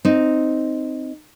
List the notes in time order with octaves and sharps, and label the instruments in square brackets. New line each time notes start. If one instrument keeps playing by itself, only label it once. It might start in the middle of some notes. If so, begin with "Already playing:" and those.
[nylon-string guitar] C4 D#4